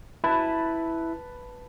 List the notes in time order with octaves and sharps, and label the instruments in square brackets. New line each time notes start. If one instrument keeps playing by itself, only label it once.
[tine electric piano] E4 [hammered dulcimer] B4 A5